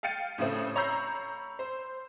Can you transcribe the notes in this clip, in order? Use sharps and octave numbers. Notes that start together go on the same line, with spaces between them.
F5 G5 A6 C#7 D#7
A2 C#3 A3 C4
C#5 A#5 B5 E6 G6 C7
C5